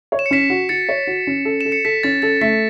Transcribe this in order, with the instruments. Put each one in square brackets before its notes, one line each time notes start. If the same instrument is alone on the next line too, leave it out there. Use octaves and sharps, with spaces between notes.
[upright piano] C#5
[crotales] E7
C#7
[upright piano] C#4 [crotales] B6 E7
[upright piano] F#4
[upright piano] F#4 [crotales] A6 C#7
[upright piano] C#5
F#4
C#4
A4
[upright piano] A4 [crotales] E7
[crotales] C#7
[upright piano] A4 [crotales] B6
[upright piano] C#4 [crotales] A6
[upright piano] A4 [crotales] A6
[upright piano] A3 [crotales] B6